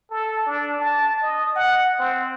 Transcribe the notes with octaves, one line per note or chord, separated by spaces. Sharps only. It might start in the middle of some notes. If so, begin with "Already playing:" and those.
A4
D4
A5
D#5
F#5
C4